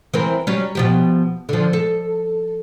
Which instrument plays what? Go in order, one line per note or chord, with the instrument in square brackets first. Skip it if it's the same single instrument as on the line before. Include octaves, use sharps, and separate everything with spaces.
[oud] E3 C4 A#4
F#3 G3 C#4
B2 F3 G4
D3 F3
A4